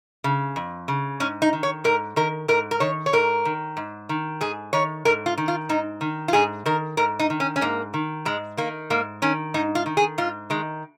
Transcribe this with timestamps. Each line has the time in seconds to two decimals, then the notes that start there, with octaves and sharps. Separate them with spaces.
0.24 C#3
0.56 F2
0.88 C#3
1.20 G#2 C#4
1.42 D#4
1.53 D#3
1.63 C#5
1.84 G#2 A#4
2.16 D#3 A#4
2.48 G#2 A#4
2.71 A#4
2.80 D#3 C#5
3.06 C#5
3.13 G#2 A#4
3.45 D#3
3.77 G#2
4.09 D#3
4.41 G#2 G#4
4.73 D#3 C#5
5.05 G#2 A#4
5.26 F4
5.38 D#3
5.48 F4
5.69 G#2 D#4
6.01 D#3
6.28 F4
6.33 G#2 G#4
6.66 D#3 A#4
6.97 G#2 A#4
7.19 D#4
7.30 D#3
7.40 C#4
7.56 C#4
7.61 G#2 A#3
7.94 D#3
8.25 G#2 G#3
8.57 D#3 A#3
8.90 G#2 A#3
9.22 D#3 C#4
9.54 G#2 D#4
9.75 F4
9.86 D#3
9.97 G#4
10.18 G#2 F4
10.50 D#3 G#3